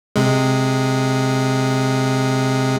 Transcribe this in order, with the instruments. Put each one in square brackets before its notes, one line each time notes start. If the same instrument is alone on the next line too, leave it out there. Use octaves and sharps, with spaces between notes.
[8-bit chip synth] C3 G#3